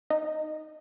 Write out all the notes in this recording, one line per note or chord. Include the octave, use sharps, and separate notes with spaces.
D#4